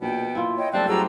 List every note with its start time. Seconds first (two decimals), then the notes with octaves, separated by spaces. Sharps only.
0.01 A#1 B2 G5
0.35 A#2 E4 F4
0.58 C#5 D#5 G5
0.73 F#1 G3 A3 C4 A4 D5 F#6
0.88 F#2 F#3 C4 E4 G4 G#4 A#5 E6